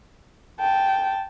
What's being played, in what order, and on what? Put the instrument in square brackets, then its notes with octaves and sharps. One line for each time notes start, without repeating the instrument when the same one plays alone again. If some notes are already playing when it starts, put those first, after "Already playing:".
[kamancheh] G5 A5